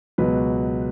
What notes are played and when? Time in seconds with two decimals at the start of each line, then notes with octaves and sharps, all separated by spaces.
0.18 C#2 B2 F#3 B4